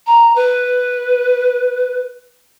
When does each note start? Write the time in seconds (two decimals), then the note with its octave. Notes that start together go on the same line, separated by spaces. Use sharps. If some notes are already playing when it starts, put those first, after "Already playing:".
0.06 A#5
0.35 B4